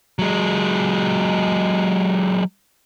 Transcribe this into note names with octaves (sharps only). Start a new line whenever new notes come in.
F#3 G#3